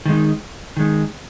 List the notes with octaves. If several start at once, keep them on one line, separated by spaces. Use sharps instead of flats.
D#3 G#3 D#4
D#3 G#3 D#4